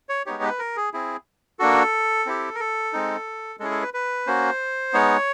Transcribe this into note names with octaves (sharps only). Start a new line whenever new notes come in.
C#5
G#3 B3 D#4 G4 C#5
B4
A#4
G#4
C4 E4 G#4
A#3 D4 F#4 A4
C4 E4 G4
A#4
A4
G#3 C4 D#4
G#3 C#4 E4 G#4 A4
A4
B4
B4
A#3 C#4 F#4 C5
G#3 B3 D#4 C#5